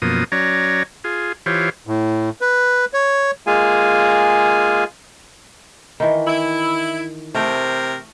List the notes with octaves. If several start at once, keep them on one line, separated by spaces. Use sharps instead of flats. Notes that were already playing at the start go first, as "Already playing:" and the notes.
F#2 B2 F3 A#3 D#6
F#3 C#4 C#5 D5 A#5
F4 G#4
E3 F4 G4 C5 C#5
A2
B4
C#5
G#3 A#3 F4 G#4 F5 G#5
D#3 E3
E4
C3 A3 A#4 C5 G5